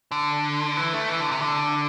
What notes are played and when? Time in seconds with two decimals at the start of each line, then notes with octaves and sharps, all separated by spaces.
0.11 D3
0.77 E3
0.93 A3
1.09 E3
1.20 D3
1.31 C3
1.41 D3